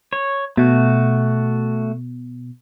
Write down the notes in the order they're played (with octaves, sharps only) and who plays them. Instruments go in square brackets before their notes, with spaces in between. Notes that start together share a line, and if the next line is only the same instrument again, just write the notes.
[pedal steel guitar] C#5
[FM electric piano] B2 [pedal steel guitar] A3 F#4